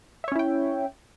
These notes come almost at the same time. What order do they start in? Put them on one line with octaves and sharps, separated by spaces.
E5 C#5 C#4 E4 G5